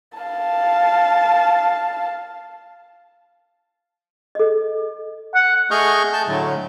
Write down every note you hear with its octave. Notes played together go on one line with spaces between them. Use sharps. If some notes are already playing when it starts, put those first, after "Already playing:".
F5 A5
A4 D#5
F#5
A3 G#4 D#5 C#6 F6 G6
A5 G6
A2 D3 F#3 A3